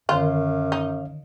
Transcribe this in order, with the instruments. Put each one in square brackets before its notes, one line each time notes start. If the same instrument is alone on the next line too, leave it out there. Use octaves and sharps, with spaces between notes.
[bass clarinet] F#2 [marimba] D3 D#3 A#4 [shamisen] F4 [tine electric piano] C#5 F5
[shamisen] D#4